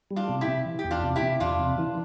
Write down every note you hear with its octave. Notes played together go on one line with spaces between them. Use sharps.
G3
D4 F4
C3
E4 G4
C3
E3
G4
E2
D4 F4
C3
E4 G4
C3
E2 D4 F4
C3
E3